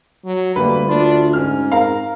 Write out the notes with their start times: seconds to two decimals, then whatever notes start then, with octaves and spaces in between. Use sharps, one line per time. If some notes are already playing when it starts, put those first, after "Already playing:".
0.25 F#3
0.56 D2 G3 A#3 B4
0.88 D4 F4
1.33 G#2 C#4 F6
1.72 C4 A#4 F5 A#5